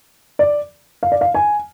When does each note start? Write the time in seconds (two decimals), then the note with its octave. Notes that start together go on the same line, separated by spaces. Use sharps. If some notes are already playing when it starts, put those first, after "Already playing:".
0.39 D5
1.03 F5
1.12 D5
1.21 F5
1.35 G#5